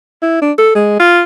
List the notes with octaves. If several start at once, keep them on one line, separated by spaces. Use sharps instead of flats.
E4
D4
A4
G#3
F4